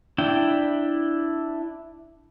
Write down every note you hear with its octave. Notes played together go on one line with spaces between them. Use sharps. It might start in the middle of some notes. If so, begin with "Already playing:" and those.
D4 E4 G5